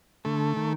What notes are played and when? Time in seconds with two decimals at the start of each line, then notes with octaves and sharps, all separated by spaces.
0.25 D3 A3
0.56 D#3